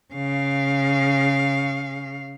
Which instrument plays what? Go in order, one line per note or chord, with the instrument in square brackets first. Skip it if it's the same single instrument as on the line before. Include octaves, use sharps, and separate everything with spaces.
[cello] C#3 F5